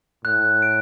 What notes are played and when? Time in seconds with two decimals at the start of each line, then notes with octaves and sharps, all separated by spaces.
0.25 A2 F#6
0.62 D7